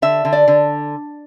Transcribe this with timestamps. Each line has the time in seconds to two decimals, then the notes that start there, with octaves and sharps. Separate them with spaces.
0.02 D3 E5
0.25 D3
0.32 D5
0.48 D3